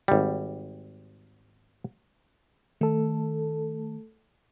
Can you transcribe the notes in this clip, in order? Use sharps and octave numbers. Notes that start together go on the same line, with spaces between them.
G#1 G3
D#3 A3 A4